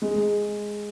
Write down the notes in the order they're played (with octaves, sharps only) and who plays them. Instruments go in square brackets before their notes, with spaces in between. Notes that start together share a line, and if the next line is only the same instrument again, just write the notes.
[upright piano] G#3